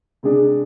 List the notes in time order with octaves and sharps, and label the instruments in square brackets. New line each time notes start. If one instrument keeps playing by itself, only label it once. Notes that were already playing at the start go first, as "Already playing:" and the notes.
[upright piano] C3 G#3 D4 G#4